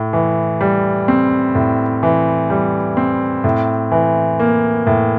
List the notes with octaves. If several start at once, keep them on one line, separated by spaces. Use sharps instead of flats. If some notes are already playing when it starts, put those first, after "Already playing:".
Already playing: A2
E3
G3
C4
A2
E3
G3
C4
A2
E3
A#3
A2